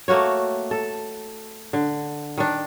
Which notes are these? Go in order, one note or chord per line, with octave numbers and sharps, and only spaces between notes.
A3 A#3 F#4 C#5
A4
D3
D#3 D4